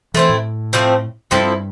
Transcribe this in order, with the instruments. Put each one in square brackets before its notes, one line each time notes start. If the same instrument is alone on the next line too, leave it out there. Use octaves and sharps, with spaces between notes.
[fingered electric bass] E3 [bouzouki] A3 C4 E4
[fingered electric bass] A2
[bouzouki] F3 A3 C4
[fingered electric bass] G2 [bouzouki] F3 C4 E4 A4